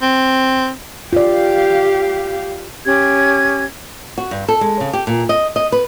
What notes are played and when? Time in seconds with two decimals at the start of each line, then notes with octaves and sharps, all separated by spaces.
0.02 C4
1.13 F4 G4 D5 F5
2.85 C#4 G4 G#6
4.18 F#4
4.31 G2
4.48 A4
4.61 G#3
4.80 C#3
4.93 G4
5.07 A#2
5.29 D#5
5.56 D#5
5.72 B4